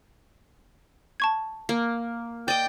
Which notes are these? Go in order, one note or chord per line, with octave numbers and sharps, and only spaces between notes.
A5 C#6 G#6
A#3
D5 D#5 G5 G6